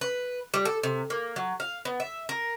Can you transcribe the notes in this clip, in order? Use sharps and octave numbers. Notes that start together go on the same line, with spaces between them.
B4
G3
A4
C3
A#3
F#3
F5
B3
E5
A#4